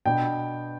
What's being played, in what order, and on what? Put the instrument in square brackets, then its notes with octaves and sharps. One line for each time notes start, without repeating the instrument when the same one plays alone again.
[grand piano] B2 B3 D4 G5